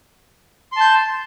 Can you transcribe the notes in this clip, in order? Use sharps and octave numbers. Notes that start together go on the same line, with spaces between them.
A5 C6 G6